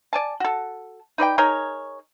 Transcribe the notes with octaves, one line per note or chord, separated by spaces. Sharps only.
D5 G#5 A5
F#4 A4
D#4 B4 D5 G5
D#4 G#4 A#4 C#5